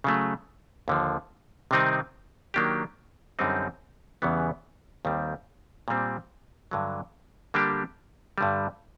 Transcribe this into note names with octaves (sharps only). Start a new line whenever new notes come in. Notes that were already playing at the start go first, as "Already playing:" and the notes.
C#3 F#3 A3
D#2 D3 F3
C3 D#3 G3 C4 D#4
D#3 F#3 A#3 D4 G4
F#2 D3 G3 C4 D#4
E2 C#3 E3 G3 B3
D#2 D#3 G3 C4
A#2 G3 C4
G2 D3 F#3
D3 G3 A#3 D4 G4
G2 D3 G3